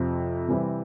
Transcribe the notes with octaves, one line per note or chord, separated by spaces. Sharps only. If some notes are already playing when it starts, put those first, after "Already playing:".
Already playing: F2 C3 F3 C4
C3 E3 G3 C4